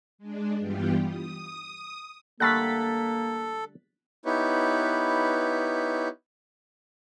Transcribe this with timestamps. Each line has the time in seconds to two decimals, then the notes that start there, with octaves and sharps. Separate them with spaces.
0.18 G#3 D4
0.58 G2 E3 G3 B3 F4 G4
1.04 D#6
2.40 D3 G3 A3 A#3 A4 F#6 A6 B6
4.26 B3 D#4 E4 G4 B4 C#5